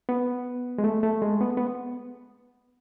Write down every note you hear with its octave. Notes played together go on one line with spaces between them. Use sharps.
B3
G#3
A3
A3
G#3
B3
B3